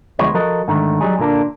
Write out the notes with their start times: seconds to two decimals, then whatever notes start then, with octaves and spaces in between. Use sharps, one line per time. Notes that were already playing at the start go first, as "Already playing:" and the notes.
0.19 D2 F3 G#3 B3 B4 C#5
0.34 F3 F#4 A4 A#4 D#5
0.68 G#2 D3 D#3 A3
1.01 F#3 G3 D#4 G#4
1.19 A#2 D3 A#3 D4